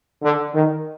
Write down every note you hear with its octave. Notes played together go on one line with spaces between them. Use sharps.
D3
D#3